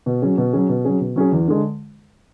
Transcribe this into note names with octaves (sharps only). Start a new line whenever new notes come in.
B2
F#3 C#4 G#4
B2
F#3 C#4 G#4
B2
F#3 C#4 G#4
B2
F#3 C#4 G#4
E2
D3 G#3